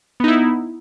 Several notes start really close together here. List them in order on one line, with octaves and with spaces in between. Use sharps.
B3 D#4 E4